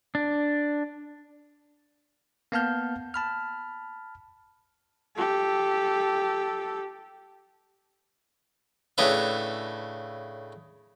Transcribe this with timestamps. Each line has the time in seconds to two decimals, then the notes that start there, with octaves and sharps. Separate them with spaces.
0.15 D4
2.52 A#3 B3 F5 A5 F6 G6
3.14 A5 B5 F6
5.16 G4 A4
8.98 A2 C#3 D4 B4 E5